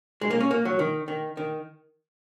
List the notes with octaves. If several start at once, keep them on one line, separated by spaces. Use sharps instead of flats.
G#3
A#3
C#4
A#3
F#3
D#3
D#3
D#3